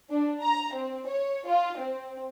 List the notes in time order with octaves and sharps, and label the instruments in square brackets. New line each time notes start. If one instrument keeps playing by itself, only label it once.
[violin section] D4
A#5
C4
C#5
F4
C4